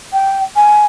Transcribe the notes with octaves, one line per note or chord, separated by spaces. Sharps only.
G5
G#5